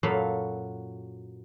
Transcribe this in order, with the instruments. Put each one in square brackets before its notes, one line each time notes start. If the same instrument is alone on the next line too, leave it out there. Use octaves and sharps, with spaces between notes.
[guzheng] F#2 A#2 F#3 A4 F5 B5